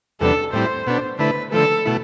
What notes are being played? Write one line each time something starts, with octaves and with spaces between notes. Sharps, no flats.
E2 C3 G3 B3 D4 A4
A2 G3 C4 E4 C5
B2 B3 D4
D3 A3 E4 B4
D3 F3 A3 A4
B2 A3 E4